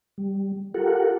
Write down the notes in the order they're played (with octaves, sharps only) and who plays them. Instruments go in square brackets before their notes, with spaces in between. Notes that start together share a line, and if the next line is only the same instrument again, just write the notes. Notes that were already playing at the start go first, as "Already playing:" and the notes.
[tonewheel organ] G3
F4 G4 A4 A#4 F#5